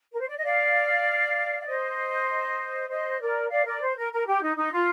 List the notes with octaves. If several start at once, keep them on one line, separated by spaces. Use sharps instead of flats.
A#4
C5
D5
D#5
D5 F5
F5
C5 D#5
C5 D#5
A#4 D5
D5 F5
A#4 D5
C5
A#4
A#4
G4
D#4
D#4
F4